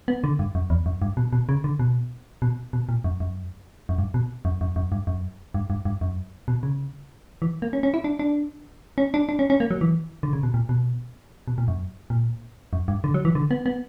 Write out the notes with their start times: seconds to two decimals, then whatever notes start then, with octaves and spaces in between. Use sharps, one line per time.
0.08 B3
0.24 D3
0.39 G2
0.55 F#2
0.70 E2
0.86 F#2
1.02 G2
1.17 B2
1.33 B2
1.49 C#3
1.64 D3
1.80 B2
2.42 B2
2.73 B2
2.89 A#2
3.04 F#2
3.20 F#2
3.89 F#2
3.98 G2
4.14 B2
4.45 F#2
4.61 F#2
4.76 F#2
4.92 G2
5.07 F#2
5.55 G2
5.70 G2
5.85 G2
6.01 F#2
6.48 B2
6.63 C#3
7.42 E3
7.62 A#3
7.73 C#4
7.83 C#4
7.94 E4
8.04 D4
8.19 D4
8.98 C#4
9.14 D4
9.29 D4
9.39 C#4
9.50 C#4
9.60 A#3
9.71 F#3
9.81 E3
10.23 D3
10.33 C#3
10.43 B2
10.54 A#2
10.69 B2
11.48 B2
11.58 A#2
11.68 F#2
12.10 A#2
12.73 F#2
12.88 G2
13.04 D3
13.14 F#3
13.25 E3
13.35 D3
13.51 B3
13.66 B3